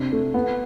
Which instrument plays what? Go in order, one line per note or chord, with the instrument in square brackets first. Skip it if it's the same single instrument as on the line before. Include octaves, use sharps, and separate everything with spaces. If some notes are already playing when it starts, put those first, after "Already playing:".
Already playing: [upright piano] C3 D4
A3
B3